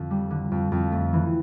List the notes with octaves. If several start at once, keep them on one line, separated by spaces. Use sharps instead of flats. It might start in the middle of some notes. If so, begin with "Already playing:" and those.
Already playing: F2 D3
G3
D3
F2
F2
A3
E3